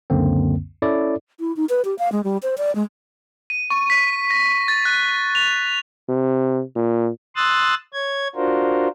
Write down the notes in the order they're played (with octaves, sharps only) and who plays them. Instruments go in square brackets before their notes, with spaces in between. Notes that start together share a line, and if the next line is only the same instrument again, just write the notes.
[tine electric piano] C#2 F#2 D3 A#3 C4
C#4 E4 A4 C#5 D5
[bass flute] E4
D#4
B4
G4
F5
G#3
G3
C5
D5
G#3
[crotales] D#7
C#6
B6
A#6
A6
F#6
F7
[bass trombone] C3
A#2
[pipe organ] C6 D#6 E6 F#6 A6
C#5 G#6
D4 F4 F#4 A#4 C5